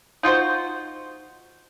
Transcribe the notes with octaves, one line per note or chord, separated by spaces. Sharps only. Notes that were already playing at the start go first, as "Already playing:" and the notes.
D#4 F4 F#4 C5